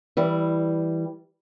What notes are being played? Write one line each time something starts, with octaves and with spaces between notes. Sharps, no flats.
E3 G3